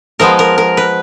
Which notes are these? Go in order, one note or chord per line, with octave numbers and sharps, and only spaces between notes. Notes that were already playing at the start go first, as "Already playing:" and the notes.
F3 G#3 B3 A#4
A#4
A#4
B4